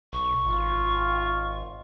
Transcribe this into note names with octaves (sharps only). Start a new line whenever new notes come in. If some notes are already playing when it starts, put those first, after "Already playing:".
B1 C#6
G#1 F4